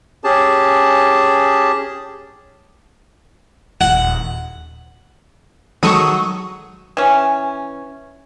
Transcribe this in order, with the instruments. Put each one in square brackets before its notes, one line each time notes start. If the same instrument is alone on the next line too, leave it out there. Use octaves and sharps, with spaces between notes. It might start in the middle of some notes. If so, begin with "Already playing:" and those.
[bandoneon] C#4 G4 G#4 A5
[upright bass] D#1 [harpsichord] F#5
[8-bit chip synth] D#3 G#3 A4 [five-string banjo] F#3 [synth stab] C#6 D#6
[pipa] E3 C#4